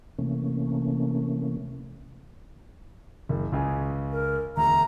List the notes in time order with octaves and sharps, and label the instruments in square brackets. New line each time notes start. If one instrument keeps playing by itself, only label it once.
[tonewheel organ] C3 E3 A3 A#3 C#4
[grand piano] F#1
C#2 C#3 G#5
[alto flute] A#4
[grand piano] E1 D2 [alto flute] A#5